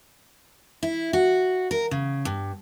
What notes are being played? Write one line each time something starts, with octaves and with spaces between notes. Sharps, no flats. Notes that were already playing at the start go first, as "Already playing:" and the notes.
E4
F#4
A#4
C#3
G2